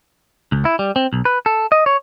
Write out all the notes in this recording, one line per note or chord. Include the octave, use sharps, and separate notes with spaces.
C#2
E4
G3
C4
B1
B4
A4
D#5
C#5